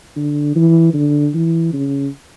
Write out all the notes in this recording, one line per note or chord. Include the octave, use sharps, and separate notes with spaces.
D3
E3
D3
E3
C#3